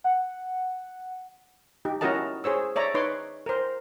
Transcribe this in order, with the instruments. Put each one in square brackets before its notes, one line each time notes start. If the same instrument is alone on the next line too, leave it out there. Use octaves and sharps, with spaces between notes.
[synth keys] F#5
[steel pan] D#4 G4
C#4 E4 F#4 A#4 D#5 A5
G#4 C5 C#5 E6
C#5 D5 E5 A#5
D#4 B4 C#5 C6 D6
A#4 C5